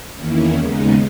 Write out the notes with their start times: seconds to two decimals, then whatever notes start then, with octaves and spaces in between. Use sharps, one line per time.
0.15 E2 D#3 A#3 C#4 E4
0.55 D#2 C#3 G#3 B3 D#4